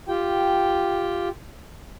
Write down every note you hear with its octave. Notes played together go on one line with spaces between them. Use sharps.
F4 G4 G5